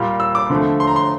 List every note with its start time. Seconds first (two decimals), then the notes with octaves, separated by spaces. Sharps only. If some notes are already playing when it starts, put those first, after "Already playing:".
Already playing: A#2 G3 A#3
0.20 E6
0.35 D6
0.50 D3 F3 A3
0.80 C6
0.87 A#5
0.96 C6